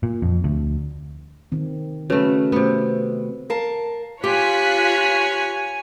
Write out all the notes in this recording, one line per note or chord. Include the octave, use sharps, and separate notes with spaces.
A#2
F2
D2
D#3 C4
C#3 A3 F#4 B4
C3 A3 B3
A#4 F5 A5
F4 G4 C#5 G#5 F#6 B6